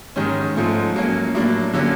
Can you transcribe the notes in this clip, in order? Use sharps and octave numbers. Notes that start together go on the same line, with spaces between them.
G#2 D#3 G#3 C#4
G#2 F3 A3 C#4
F#3 A#3 C#4
A2 F#3 A#3 D4
D3 F#3 A#3 C#4